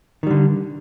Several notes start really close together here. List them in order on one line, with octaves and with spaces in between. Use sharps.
D#3 G3 D3